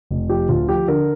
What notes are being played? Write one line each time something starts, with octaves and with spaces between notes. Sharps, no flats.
F1
F3 G4
D2 F4
F3 G4
D3 A#4